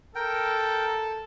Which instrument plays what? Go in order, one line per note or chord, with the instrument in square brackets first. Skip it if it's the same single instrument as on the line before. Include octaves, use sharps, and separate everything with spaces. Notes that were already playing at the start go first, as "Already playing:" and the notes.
[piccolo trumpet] A4 [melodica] A#4 G5